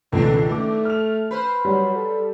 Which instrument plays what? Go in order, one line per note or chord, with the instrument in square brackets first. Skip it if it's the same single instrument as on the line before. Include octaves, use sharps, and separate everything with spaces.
[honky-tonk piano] C#2 B2 [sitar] D#3 D4 [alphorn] A4
[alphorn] A3 [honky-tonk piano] D6
[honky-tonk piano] F6 F7
[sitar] B4 C5
[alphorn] F#3 [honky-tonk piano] G3
[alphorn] A4